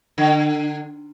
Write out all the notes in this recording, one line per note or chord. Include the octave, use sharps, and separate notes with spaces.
D3